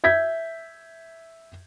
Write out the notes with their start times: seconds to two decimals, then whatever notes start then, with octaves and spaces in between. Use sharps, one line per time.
0.04 E5 G6 G#6 B6